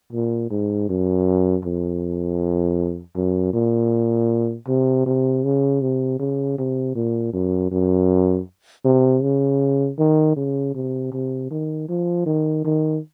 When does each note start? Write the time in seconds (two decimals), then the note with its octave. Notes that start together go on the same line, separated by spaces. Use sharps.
0.13 A#2
0.51 G#2
0.89 F#2
1.65 F2
3.16 F#2
3.54 A#2
4.68 C3
5.06 C3
5.44 C#3
5.82 C3
6.20 C#3
6.58 C3
6.95 A#2
7.33 F#2
7.72 F#2
8.85 C3
9.23 C#3
9.99 D#3
10.37 C#3
10.75 C3
11.12 C3
11.51 D#3
11.89 F3
12.26 D#3
12.65 D#3